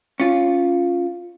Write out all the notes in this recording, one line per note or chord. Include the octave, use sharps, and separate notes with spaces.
C#4 F4